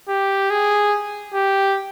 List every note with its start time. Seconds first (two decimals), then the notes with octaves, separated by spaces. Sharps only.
0.09 G4
0.50 G#4
1.34 G4